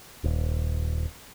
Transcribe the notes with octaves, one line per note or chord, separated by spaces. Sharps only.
D#1